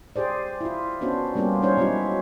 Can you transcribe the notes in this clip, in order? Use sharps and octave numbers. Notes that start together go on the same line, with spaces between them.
G4 G#4 C5 D5
E4 F4
B3 C#4 D4 F#4 C5
G3 A#3 B3 C#4 F4 G4
C#4 D#4 C5 C#5
F#3 G#3 B3 C#4 E4 F#4